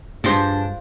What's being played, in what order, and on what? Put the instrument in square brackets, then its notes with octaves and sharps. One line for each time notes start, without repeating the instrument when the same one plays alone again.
[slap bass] G2 [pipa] F3 G3 C5 [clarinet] D4 [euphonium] G#4